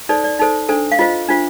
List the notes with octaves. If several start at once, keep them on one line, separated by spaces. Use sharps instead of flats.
D#4 A4 C5 D5
D5
D#4 A4 C5
D4 A4 C5
F5
F4 C5 D#5
D4 F4 C5